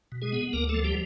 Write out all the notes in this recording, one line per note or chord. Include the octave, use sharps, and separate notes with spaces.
B2
G#3 G#4
B3
D2 A#3 A#4
A3 A4
F3
G3 G4